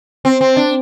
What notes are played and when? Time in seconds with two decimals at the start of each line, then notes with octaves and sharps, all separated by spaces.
0.25 C4
0.41 C4
0.57 D4